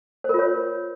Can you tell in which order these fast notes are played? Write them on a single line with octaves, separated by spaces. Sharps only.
C5 A#4 F4 C#5